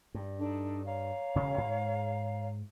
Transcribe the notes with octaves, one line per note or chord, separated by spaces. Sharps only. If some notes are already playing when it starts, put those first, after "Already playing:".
G2
D4 D#4 A4
C#5 F5 A#5
E1 C#3 C#4
G#2